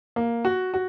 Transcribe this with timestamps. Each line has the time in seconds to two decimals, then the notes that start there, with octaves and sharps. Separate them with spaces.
0.16 A#3
0.45 F#4
0.74 F#4